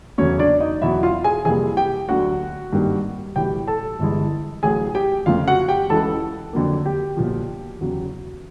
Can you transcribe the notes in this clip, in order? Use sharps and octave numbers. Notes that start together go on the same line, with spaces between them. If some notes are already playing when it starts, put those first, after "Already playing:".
E1 E2 C#3 F#3 A3 C#4 C#5
D4 D5
D#4 D#5
E2 B2 F#3 E4 E5
F4 F5
G#4 G#5
F2 C3 E3 G3 A#3 G#4 G#5
G4 G5
D2 D3 F#3 A3 F#4 F#5
G#1 G2 D#3 G3 A#3
B1 A2 E3 G3 G4 G5
A4 A5
G1 G2 E3 G#3
A1 A2 F#3 G#4 G#5
G4 G5
F2 C#3 F3 A3 F4 F5
F#4 F#5
G4 G5
C#2 C#3 E3 G#3 A4 A5
F2 D3 F#3 A#3
G4 G5
B1 A#2 F3
E2 C#3 F#3